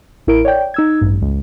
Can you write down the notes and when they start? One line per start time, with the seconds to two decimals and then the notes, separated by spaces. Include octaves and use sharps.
0.27 A1 E4 A#4 D7
0.45 C#5 D5 G5 G6
0.74 D#4 E6 G#6
1.01 A1 G2
1.22 C#2